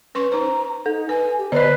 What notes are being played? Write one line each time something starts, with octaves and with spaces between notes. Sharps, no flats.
C#4 B4 C6 C#6
D#4 C5 A#5
D#4 A4
B4 G#5
G4
D3 B4 C5 D5 D#5